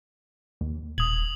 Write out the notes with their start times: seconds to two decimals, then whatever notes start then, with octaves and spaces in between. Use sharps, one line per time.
0.61 D#2
0.98 D#1 D#6 G#6 F#7